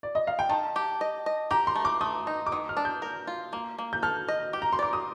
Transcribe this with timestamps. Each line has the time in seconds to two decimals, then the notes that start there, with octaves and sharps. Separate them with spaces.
0.03 D5
0.15 D#5
0.27 F5
0.39 G5
0.49 D#3 A5
0.76 G4
1.01 D#5
1.26 D#5
1.51 G4 A#5
1.67 C6
1.76 A3
1.85 D6
2.01 A3 D#6
2.27 D#4
2.47 D6
2.52 D#3 D#6
2.69 F6
2.77 D4
2.85 G6
3.02 A#4
3.27 F4
3.53 A#3
3.79 A#3
3.93 G6
4.03 A4 F6
4.28 D#5
4.53 G4
4.62 A#5
4.73 C6
4.79 D5 D6
4.93 D#6